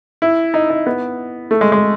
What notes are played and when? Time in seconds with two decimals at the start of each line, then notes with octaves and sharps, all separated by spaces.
0.22 E4
0.54 D#4
0.70 D#4
0.86 B3
1.51 A3
1.61 G#3
1.72 G#3